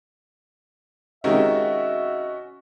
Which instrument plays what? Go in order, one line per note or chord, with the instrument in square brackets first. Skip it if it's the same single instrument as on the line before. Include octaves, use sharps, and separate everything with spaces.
[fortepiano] C3 D#3 G#3 [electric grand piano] C#4 F#4 [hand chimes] D#5 [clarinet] E5